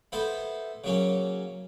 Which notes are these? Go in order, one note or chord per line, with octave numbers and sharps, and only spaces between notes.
B3 E4 A4 C5 E5
C#3 F#3 A#3 C#4